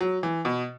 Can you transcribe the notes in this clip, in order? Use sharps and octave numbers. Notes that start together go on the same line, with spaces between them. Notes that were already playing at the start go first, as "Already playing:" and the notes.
F#3
E3
B2